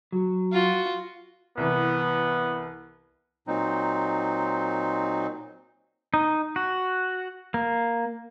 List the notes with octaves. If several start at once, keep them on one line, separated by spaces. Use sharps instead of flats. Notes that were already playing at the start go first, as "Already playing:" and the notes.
F#3
F4 F#4
C2 E3 B3
A#2 F#3 C4 D#4
D#4
F#4
A#3